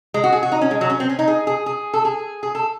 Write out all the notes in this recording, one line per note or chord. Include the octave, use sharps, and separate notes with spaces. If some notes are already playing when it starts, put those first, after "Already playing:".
G#3
F#4
G#4
F#4
D#4
C#4
G#3
F#3
C#4
C4
C#4
D#4
G#4
G#4
G#4
A4
G#4
G#4
A4